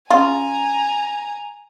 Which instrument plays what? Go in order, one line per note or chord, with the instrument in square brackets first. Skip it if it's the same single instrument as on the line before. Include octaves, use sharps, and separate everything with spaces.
[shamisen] C#3 F4 [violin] G#5 A#5